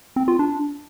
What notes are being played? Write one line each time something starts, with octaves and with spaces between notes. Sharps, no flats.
C4
F4
D4